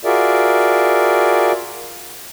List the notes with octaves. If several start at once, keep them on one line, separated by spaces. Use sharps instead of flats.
F4 F#4 G#4 A#4 D5 E5